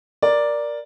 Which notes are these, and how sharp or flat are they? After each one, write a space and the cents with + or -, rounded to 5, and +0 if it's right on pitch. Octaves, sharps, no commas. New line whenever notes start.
A#4 +10 D5 +0